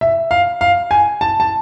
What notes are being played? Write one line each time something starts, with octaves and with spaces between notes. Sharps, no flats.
E5
F5
F5
G#5
A5
A5